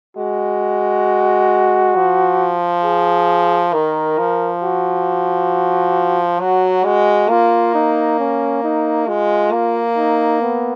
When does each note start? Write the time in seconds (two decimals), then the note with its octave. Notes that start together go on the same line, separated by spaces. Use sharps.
0.17 G#3 F#4
1.96 F3
2.84 G#4
3.73 D#3 A#4
4.18 F3
4.63 F#4
6.40 F#3 F#4
6.84 G#3 F#4
7.29 A#3 F4
7.75 D#4
8.19 C#4
8.64 D#4
9.07 G#3 F4
9.52 A#3
9.97 D#4
10.41 B3